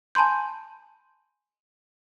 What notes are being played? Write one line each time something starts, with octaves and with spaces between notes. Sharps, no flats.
G#5 A5 B5 C6 G6